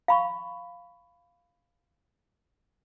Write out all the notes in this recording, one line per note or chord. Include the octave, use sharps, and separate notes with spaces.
F5 B5 C#6